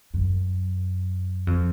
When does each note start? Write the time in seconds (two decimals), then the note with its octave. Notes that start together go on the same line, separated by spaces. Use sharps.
0.14 F#2
1.47 F2